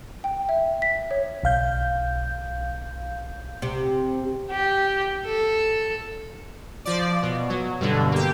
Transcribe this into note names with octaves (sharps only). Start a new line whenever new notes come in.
G5
E5
B6
C#5
B1 F5 G6
C3
G4
A4
F3 D5
B2
F#3
G2 B2 D3
A#3 G4